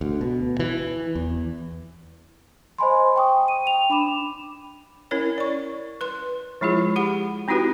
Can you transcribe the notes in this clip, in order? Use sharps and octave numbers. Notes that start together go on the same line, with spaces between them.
D2
B2
E3
E2
C5 D#5 G#5 B5 C6
G5 C#6 D#6
D#7
G5 F7
D4 B5 D6 E7
C#4 E4 A#4 C#5
D5 C#6
B4 C6
F3 G#3 E4 F4 G#4
G4 F#5 B5
C4 D#4 E4 F#4 G4 B4